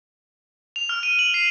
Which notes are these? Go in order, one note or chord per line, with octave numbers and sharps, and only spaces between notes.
F7
F6
D#7
F#7
C7